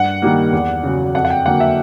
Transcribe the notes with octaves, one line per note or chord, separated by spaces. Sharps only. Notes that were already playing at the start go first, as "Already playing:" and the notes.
Already playing: G2 F#5
D#3 G3 A#3
E2
C#3 F#3
F2 F#5
F#5
G5
D3 F#3 A#3 F#5
E5